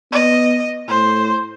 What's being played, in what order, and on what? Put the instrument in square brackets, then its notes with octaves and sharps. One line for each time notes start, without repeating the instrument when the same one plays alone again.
[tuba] B3 [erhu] D#5
[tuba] A2 [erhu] C5